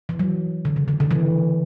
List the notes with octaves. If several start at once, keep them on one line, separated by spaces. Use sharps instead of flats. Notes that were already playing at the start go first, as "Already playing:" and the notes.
E3
F#3
D3
C#3
D3
D3
E3